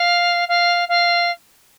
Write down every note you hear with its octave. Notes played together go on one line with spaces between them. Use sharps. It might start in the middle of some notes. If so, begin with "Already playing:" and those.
Already playing: F5
F5
F5